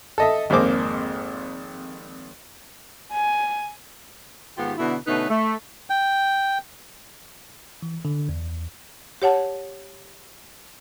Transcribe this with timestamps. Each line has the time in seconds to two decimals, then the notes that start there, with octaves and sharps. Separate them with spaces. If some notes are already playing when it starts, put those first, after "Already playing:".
0.18 A4 D#5 E5
0.50 G#1 F2 A#3 G#4 C5 D6
3.12 G#5
4.58 G#2 D#3 B3 F4 G4
4.78 B2 D3 E4
5.07 B2 D3 A3 C#4 D#4 B4
5.30 A3
5.90 G5
7.82 E3
8.05 D3
8.29 E2
9.22 G4 C#5 F#5 A5